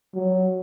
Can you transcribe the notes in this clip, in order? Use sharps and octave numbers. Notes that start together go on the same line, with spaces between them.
F#3